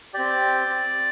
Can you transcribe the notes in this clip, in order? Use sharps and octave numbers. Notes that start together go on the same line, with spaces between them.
C4 G4 D5